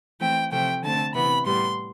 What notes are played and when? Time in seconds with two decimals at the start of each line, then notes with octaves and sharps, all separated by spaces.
0.20 E3 A3 C4 G5
0.51 C3 F3 A3 G5
0.83 D3 A3 C4 A5
1.14 C3 E3 B3 B5
1.45 A2 G3 B3 C6